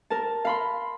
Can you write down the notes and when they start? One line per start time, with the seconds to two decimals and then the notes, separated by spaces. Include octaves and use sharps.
0.10 A#4 A5
0.45 F5 B5 C6